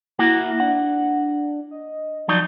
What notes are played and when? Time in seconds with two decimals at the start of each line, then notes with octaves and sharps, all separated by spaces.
0.19 A#3 E4 F#4 F#5
0.60 D4 F#5
1.71 D#5
2.28 F3 F#3 D#4 D5